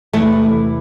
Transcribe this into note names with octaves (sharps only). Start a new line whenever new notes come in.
E2 C3 E3 A3